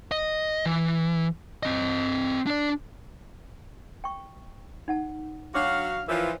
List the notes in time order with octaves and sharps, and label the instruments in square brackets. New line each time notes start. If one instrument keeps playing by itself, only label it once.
[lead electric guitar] D#5
E3
C4 D#5
D4 D5
[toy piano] G5 C#6
D#4 F#5 A5
[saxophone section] F#3 F#4 F5 [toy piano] D4 C#5 D6
[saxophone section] E3 F3 [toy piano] A#4 C#5